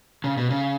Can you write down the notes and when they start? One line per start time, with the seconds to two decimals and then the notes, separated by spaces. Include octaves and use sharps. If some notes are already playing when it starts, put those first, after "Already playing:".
0.24 C#3
0.37 B2
0.50 C#3